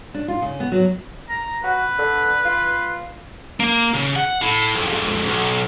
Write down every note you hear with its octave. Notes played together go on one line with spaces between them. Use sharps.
D4
F4
C#3
B3
F#3
A#5
F#4 B4
D3
F4
A#3
C#3
F#5
A2
F2 G#2
B1